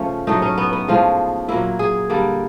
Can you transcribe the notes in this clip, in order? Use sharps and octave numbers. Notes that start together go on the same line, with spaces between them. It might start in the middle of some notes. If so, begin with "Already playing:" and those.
Already playing: C#3 F3 A3 C#4
A2 F#3 A3 D#4
C#4
B3
B3
A2 F3 G#3 F4
A#2 F#3 A#3 E4
G#4
D3 G3 A#3